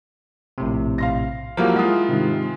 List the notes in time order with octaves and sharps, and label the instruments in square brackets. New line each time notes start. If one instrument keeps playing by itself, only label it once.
[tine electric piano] A#1 A2 C3
[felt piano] F5 C6 A#6
[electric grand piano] F3 F#3 A#3 [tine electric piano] E4 A#4 [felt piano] G4 E5 F5
[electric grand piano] G#3 F4 [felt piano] F#5 D#6
[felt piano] G#2 C3 D#3